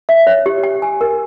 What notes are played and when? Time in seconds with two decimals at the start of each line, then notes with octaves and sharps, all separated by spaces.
0.09 E5
0.27 C#5
0.46 G4
0.63 G5
0.82 G#5
1.01 A#4